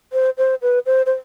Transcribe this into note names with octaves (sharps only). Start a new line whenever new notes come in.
C5
C5
B4
C5
C5